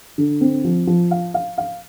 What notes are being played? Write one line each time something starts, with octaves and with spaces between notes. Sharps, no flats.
D3
C4
F3
F3
F5
F5
F5